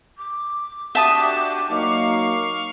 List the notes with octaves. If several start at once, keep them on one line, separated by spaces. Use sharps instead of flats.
D6
D4 F#4 G4 E5 A5 D#6
F#3 A#3 D#4 F5 C#6 F6